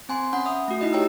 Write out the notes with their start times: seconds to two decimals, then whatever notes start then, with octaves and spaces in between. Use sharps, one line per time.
0.09 C4 G#5 C6
0.33 C#4 F#5 B5
0.46 E5 D#6
0.68 A3 F#4
0.81 D#4 E4 D#5
0.93 G4 C#5 G5 A#5 E6